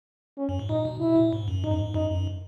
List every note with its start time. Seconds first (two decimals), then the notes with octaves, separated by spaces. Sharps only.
0.38 C#4
0.49 F#2
0.59 G#2
0.69 A#2 D#4
0.85 B2
1.00 B2 E4
1.16 A#2
1.33 G#2
1.48 F#2
1.63 G#2 D#4
1.71 F#2
1.78 G#2
1.94 F#2 D#4
2.11 F#2